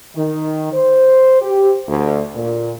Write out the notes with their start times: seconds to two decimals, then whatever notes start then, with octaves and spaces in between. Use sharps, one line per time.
0.16 D#3
0.73 C5
1.42 G4
1.88 D2
2.35 A#2